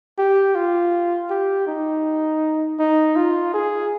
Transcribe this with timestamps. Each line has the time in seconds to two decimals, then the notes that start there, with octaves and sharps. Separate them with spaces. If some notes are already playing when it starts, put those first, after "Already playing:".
0.18 G4
0.55 F4
1.30 G4
1.67 D#4
2.79 D#4
3.16 F4
3.54 G#4